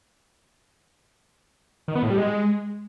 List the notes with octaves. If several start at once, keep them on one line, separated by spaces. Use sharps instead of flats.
D#3
B3
A2
G3
G#3